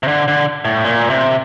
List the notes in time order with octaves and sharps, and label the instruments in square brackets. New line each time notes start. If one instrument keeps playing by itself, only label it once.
[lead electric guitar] C3
D3
D3
A2
A#2
C3